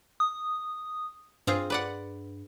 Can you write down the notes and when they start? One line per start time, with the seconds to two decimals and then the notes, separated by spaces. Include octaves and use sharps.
0.20 D#6
1.47 G2 C4 F4 G#4
1.70 B4 D5 F#5